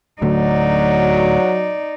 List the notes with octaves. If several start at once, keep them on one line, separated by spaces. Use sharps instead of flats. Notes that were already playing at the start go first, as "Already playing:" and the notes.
D1 D3 F#3 A3 D#4 D5